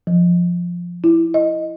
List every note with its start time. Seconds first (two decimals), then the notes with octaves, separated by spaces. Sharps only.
0.07 F3
1.04 E4
1.34 D#5